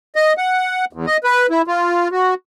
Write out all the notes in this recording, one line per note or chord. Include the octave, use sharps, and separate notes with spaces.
D#5
F#5
E2
D#5
B4
E4
F4
F#4